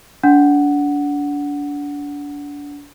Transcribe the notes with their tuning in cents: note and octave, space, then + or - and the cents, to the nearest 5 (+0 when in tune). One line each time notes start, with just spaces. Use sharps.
D4 -30 F#5 +0